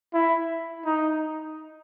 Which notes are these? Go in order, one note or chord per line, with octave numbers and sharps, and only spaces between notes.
E4
D#4